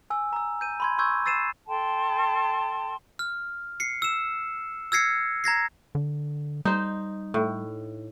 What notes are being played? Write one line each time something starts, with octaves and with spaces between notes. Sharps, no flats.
G#5 E6
A#5 E6
G6 D#7
B5 C6 G#6
C6 C#6 E6 G6 G#6
E6 A6 C7 D#7 E7
A4 G5 A5 C6
F6
C7 C#7
E6 E7
E6 F6 G#6 A#6 C7 C#7
A#5 G#6 A#6 C7
D3
G3 D#4 C5
A2